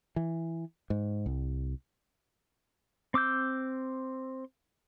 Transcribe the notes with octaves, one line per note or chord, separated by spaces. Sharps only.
E3
G#2
C2
C4 D6 E6 G6